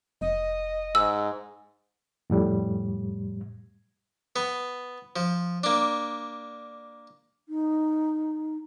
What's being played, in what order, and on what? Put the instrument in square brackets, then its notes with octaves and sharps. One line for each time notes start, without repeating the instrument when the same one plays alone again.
[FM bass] F1 [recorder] D#5
[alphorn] G#2 [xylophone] E6
[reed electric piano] F2 A2 G3
[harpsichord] B3
F3
A#3 D4
[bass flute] D#4